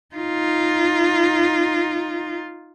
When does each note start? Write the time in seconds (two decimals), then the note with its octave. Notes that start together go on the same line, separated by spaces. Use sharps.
0.15 D#4 F4